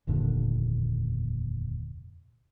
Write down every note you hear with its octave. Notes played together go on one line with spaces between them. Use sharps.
F1 D#2 A#2 D3